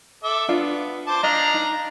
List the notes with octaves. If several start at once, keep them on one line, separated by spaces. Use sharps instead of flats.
A4 E5 D6
B3 D4 F4 F5
C5 A5 D6
D4 D#5 F5 A#5
D#4